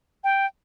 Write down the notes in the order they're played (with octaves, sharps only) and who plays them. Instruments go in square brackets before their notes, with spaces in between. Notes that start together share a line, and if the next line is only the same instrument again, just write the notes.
[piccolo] G5